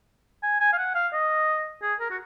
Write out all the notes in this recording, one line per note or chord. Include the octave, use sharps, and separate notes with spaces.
G#5
G#5
F5
F#5
F5
D#5
G#4
A#4
F#4